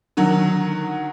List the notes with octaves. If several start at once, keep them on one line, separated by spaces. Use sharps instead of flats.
D3 D#3 F#3